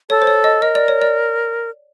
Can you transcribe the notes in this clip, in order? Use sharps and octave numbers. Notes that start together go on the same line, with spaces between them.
A4 C#5
C5
C#5
D#5
A#4 D#5
D5
C#5
D5